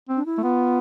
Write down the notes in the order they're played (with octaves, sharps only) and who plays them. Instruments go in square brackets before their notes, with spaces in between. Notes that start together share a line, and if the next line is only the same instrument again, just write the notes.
[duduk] C4
[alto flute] D4
E4
[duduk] A3
[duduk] B3 [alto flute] F4